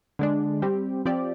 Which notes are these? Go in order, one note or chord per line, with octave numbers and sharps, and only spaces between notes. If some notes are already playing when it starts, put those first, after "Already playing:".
D3 G#3 D4
G3 C4 G4
F3 C4 G4 D5